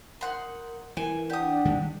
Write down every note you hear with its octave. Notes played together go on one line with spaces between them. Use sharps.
D#4 A#4 F#5 C6
E3 A#4 G#5
D4 G4 F#5 D#6
D#3 G3 G#3